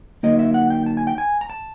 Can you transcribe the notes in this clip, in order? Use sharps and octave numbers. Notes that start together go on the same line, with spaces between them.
D3 F#3 A#3 D#4 D#5
E5
F#5
G5
A5
G#5
G5
G#5
A#5
A5